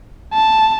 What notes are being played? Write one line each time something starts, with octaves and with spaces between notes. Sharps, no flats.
A5